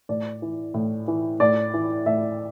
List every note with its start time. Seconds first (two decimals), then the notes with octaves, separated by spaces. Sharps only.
0.09 A2 D5
0.42 E3
0.74 A2
1.08 E3
1.40 A2 D5
1.74 E3
2.06 A2 E5